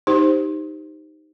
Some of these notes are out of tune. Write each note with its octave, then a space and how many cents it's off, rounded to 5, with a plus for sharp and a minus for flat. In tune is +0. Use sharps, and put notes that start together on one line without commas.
D#4 +0 G4 +0 C5 +0